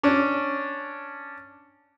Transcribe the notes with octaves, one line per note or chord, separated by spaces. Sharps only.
C#4 D4